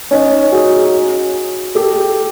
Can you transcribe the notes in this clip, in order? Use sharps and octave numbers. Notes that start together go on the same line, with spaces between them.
C#4 D#4
F#4 G#4
G4 A4